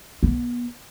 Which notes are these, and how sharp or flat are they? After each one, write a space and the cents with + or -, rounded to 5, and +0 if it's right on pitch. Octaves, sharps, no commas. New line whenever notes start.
B3 -35